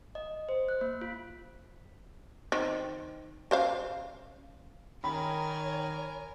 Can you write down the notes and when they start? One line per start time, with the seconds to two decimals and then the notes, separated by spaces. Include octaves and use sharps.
0.15 D#5
0.49 C5
0.69 F#6
0.81 A#3
1.01 F4
2.52 D#3 C4
3.51 C#3 C5 F5
5.04 D#3 A#4 C#5 G#5 B5